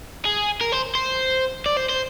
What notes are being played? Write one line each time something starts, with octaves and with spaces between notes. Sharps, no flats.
G#4
A#4
C5
C5
D5
C5
C5